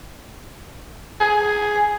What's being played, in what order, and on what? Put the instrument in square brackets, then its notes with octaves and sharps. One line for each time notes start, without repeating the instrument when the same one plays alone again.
[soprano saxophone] G#4